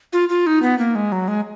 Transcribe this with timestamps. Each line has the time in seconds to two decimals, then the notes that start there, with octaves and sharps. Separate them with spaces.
0.13 F4
0.29 F4
0.47 D#4
0.62 B3
0.79 A#3
0.95 G#3
1.12 F#3
1.28 G#3